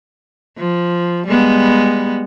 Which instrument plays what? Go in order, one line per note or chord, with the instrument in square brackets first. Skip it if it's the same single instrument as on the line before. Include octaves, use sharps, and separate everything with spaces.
[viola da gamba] F3
G3 G#3 B3